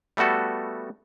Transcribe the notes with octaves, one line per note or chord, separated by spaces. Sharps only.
G3 A3 B3 F#4 A4